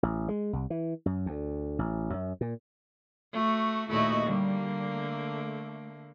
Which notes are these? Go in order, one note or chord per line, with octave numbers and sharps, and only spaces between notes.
A1
G#3
C2
E3
F#2
D2
A1
F#2
A#2
A3 F#4
D#2 A#2 A3 E4 F#4 D#5
D3 G3 A#3
A3